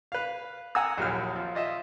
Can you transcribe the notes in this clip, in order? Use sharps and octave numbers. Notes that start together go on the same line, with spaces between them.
B4 F5
F#5 G#5 A#5 E6
A#1 D#2 F#3 F6
F3
F4 D#5 E5